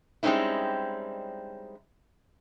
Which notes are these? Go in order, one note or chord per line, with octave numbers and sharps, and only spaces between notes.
G3 G#3 C4 C#4 D#4 E4